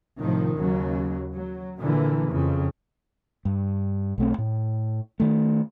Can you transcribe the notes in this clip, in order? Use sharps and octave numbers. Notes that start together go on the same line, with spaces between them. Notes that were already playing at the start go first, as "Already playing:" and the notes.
A2 C3 D#3 F3
D#2 C#3 F#3
F#3
A#2 D3 E3 A#3
F2 C#3
G2
B1 A3 C4
A2
D#3 A3